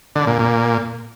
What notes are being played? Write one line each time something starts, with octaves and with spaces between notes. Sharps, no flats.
D3
A#2
A#2